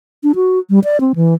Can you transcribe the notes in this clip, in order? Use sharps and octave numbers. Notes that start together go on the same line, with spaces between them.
D4
F#4
G3
D5
C4
E3